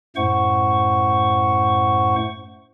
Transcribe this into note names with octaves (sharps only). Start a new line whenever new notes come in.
F#2 A2 A3 C5 F#5 C#6